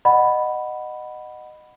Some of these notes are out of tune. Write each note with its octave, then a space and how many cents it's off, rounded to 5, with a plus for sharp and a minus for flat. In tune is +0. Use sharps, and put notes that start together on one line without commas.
D#5 -15 F#5 +0 B5 +0